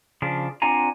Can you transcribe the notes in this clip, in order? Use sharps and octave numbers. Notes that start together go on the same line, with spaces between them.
C#3 F3 D4
C4 D4 F4 F#5 G#5 A#5